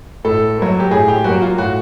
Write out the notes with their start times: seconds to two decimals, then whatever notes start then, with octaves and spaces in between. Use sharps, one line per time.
0.25 A2 A4
0.58 F#3 A#3
0.80 G4
0.91 A2 G#4
1.08 G4
1.24 F#3 A#3 F#4
1.42 F4
1.58 A2 F#4